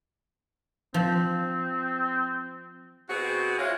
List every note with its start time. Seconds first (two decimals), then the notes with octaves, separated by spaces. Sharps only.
0.94 F3 C4
3.09 B2 C4 F#4 G#4
3.58 G#3 E4 F4 C#5